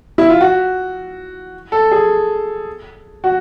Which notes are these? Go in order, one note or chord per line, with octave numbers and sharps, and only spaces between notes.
E4
F4
F#4
A4
G#4
F#4